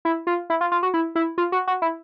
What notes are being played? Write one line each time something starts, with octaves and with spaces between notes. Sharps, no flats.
E4
F4
E4
F4
F4
F#4
E4
E4
F4
F#4
F#4
E4